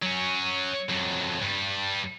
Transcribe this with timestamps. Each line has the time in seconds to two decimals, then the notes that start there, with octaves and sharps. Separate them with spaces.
0.03 F#3 C#4
0.90 F2 F#3
1.41 G2 G3